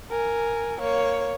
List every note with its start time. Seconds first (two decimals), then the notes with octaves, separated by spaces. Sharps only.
0.11 A#4 G#5
0.81 A#3 C#5